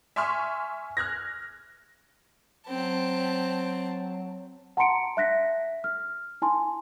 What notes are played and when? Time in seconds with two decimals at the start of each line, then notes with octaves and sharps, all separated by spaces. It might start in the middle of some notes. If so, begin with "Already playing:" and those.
0.16 E5 G#5 C6 C#6 F6
0.97 F6 F#6 G#6 A#6
2.67 F#3 C4 A5
4.77 F#5 A5 A#5 C6 C#7 D7
5.17 E5 F#6 A#6 B6
5.84 F6
6.42 E4 G#5 A5 C6